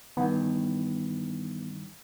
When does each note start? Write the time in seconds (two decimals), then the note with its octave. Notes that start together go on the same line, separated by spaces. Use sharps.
0.17 G2 D#3 E3 B3